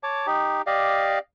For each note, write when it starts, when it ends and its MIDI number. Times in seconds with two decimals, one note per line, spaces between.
0.03 0.26 73
0.03 0.26 81
0.03 0.26 86
0.26 0.62 63
0.26 0.62 67
0.67 1.19 67
0.67 1.19 74
0.67 1.19 75
0.67 1.19 77